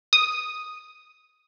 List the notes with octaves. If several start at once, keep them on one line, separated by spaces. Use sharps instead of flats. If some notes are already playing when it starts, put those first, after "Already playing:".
D#6